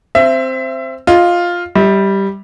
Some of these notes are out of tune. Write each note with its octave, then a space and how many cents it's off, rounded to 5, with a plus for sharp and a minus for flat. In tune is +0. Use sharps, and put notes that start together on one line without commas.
C4 +0 E5 +25
F4 +5 D#5 +0
G3 +0 E5 -40